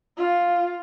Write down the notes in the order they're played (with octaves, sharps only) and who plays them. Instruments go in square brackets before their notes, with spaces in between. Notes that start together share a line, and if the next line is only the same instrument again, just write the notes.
[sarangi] F4